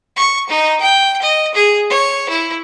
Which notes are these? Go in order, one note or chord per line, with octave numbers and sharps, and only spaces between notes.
C#6
D#4
G5
D#5
G#4
C#5
E4